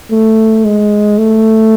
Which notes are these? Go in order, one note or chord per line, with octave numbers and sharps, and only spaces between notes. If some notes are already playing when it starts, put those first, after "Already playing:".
A3
G#3
A3